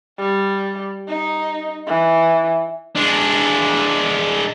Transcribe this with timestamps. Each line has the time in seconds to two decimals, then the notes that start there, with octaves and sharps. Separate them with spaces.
0.19 G3
1.08 D#4
1.87 E3
2.95 G#3 D4